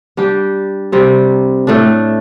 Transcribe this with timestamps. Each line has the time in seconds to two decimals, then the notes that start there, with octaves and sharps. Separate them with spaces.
0.17 G3 D4 G4
0.92 C3 G3 C4
1.67 A2 A3 D4